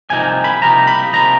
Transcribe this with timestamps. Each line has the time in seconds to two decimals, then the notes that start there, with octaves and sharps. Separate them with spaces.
0.10 C2 C3 F3 A#3 D#4 G#5
0.44 B5
0.62 C2 C3 F3 A#3 D#4 A#5
0.87 B5
1.13 C3 F3 A#3 D#4 A#5